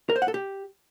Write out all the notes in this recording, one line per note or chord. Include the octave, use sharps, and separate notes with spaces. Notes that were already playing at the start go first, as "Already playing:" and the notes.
A#4
C5
F#5
A4
G4